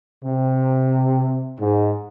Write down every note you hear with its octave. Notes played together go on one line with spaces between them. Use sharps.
C3
G#2